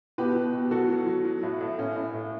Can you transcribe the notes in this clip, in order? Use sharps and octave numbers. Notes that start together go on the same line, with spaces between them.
B2 G4 B4
B2
B2
F#3 F#4 A4
F#3
F#3
F#3
A2
A2
A2 C#4
A2
A2